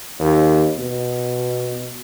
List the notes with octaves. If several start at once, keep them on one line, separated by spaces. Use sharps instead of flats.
D#2
B2